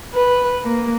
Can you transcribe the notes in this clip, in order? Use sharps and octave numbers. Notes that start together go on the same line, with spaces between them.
B4
A#3